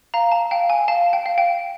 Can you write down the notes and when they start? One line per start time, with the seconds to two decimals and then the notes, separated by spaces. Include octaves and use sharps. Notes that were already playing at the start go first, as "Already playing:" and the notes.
0.14 F5 A#5
0.32 A5
0.51 F5 G5
0.70 G#5
0.88 F5 A5
1.13 G5
1.26 F5
1.38 G5